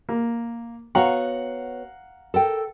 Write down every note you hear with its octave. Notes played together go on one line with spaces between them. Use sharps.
A#3
B3 F#4 C#5 F5 F#5 A#5
A4 A#4 G5